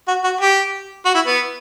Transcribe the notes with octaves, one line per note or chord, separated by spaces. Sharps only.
F#4
F#4
G4
F#4
E4
B3